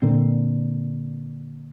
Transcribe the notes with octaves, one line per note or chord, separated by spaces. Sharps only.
A#2 D3 C4